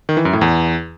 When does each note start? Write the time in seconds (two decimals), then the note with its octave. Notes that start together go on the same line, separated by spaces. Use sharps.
0.09 D#3
0.17 E3
0.25 F#2
0.33 A2
0.41 E2